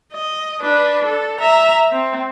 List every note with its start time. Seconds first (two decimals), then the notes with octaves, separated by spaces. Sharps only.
0.13 D#5
0.61 D4 B4
1.05 A4
1.41 E5 A#5
1.92 C4